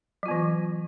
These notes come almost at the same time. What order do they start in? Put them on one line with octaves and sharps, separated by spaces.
F#3 F4 B3 E3